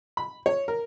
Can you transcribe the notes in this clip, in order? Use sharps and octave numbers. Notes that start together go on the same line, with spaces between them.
B5
C#5
A#4